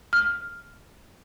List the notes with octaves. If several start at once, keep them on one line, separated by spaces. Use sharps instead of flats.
F6